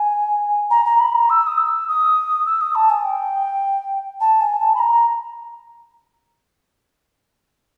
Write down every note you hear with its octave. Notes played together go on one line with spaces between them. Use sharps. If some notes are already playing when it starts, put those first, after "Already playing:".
Already playing: G#5
A#5
A#5
B5
A#5
E6
D#6
E6
D#6
E6
D#6
A5
G#5
G5
A5
G#5
A5
B5
A#5